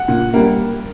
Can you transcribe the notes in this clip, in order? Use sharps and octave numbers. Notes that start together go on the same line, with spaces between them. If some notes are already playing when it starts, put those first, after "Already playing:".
Already playing: F#5
A#2
G3 A#3